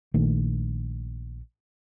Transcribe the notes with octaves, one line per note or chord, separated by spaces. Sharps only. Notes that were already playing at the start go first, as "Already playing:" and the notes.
A#1 D#3 A3 A#3